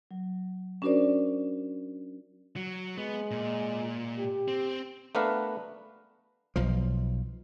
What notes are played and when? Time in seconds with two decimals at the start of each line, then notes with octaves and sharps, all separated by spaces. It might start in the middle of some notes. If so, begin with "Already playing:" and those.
0.11 F#3
0.82 C#4 D4 F#4 A#4 C5 D5
2.56 F#3
2.97 G#3 B3
3.31 A#2
4.18 G4
4.48 C4
5.15 A3 B3 D4 A#4 B4 F5
6.56 B1 F3